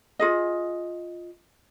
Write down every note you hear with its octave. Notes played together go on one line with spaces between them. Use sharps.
F4 G#4 D#5